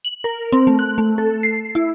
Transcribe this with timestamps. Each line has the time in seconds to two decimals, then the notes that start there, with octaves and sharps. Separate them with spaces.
0.05 F#7
0.24 A#4
0.52 C4
0.67 A3
0.79 F#6
0.98 A3
1.18 A4
1.43 C7
1.75 E4